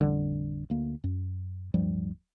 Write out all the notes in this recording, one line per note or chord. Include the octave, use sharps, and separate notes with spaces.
A1 F2 D3 G3
D2 A#3
F#2
D1 G2 F3 G3